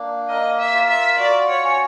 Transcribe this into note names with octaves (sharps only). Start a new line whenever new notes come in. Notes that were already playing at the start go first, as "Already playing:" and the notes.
Already playing: A#3 D4
A#4 D#5
E5
F4
E5
F#4 D5
C#5
C#4